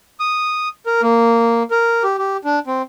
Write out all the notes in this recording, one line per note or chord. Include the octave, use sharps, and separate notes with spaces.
D#6
A#4
A#3
A#4
G4
G4
D4
C4